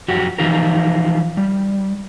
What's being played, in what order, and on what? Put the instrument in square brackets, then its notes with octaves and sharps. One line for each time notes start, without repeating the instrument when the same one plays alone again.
[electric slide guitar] F#2 F3 F#4 G4
E3 F3 D#4 F4 G4 A#4
G3